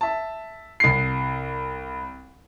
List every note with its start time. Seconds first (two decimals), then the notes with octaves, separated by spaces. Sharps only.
0.01 E5 A5
0.80 C2 C7